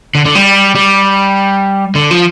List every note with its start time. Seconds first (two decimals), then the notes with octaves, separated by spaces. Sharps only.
0.15 D3
0.26 D3
0.35 G3
0.75 G3
1.95 D3
2.11 F3